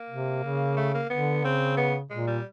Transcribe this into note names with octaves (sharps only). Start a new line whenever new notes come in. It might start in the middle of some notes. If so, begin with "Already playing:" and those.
Already playing: A#3
C3
C#3
A3
A#3
D3 B3
C#3 C4
B3
A#2 G#3
G3